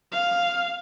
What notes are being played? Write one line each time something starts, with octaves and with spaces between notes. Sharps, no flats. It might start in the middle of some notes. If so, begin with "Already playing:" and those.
F5